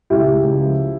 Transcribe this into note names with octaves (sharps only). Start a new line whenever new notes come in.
C#2 E4 G4
C#2
C#2
F3